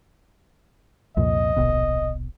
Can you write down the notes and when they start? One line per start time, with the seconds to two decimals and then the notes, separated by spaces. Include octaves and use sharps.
1.17 C2 F2 A#2 D#5
1.57 D1 A#1 B2